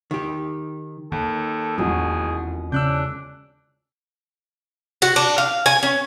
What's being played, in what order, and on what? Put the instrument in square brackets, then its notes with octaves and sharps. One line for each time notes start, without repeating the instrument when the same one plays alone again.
[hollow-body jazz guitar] D#3 G4
[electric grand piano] D#2 [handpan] D#3 [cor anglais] A4
[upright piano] E1 A1 F2 [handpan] F#4 [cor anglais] G#4
[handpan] C#3 C#4 [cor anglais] D4 [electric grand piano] E6 F#6 G6
[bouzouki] F#4
D4
F5
G#5
C#4